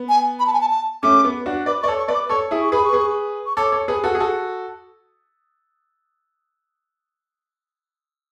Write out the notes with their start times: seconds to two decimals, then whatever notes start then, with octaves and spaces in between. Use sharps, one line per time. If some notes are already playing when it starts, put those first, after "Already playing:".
Already playing: B3
0.09 G#5
0.40 B5
0.47 A5
0.54 G#5
0.61 A5
0.71 A5
1.03 A3 C#4 D6
1.25 B3
1.46 D4 F#4
1.66 B4 D5 D6
1.82 D5 C#6
1.88 A4 C#5
1.99 C#6
2.08 B4 D5
2.15 D6
2.29 A4 C#5 C#6
2.51 E4 G#4
2.62 C#6
2.72 G#4 B4 B5
2.85 C#6
2.93 G#4 B4
3.46 C#6
3.56 A4 C#5 D6
3.72 A4 C#5
3.88 G#4 B4
4.04 F#4 A4
4.15 G#4
4.20 F#4 A4